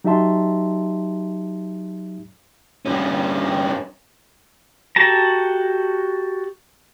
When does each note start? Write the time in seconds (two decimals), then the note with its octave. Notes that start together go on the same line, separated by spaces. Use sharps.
0.04 F#3 D#4 G4 E5 A5 C6
2.86 G2 C#4
4.96 F#4 G4 A4 A5 A#5